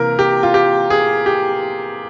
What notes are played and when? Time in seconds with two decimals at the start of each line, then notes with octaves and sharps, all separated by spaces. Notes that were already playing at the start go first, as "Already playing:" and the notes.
Already playing: C3 E3 A#3 A#4
0.19 G4
0.43 F4
0.54 G4
0.90 G#4
1.26 G4